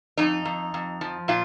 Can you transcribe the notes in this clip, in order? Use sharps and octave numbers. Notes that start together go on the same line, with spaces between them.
F2 D#4
F2
F2
F3
A#2 F4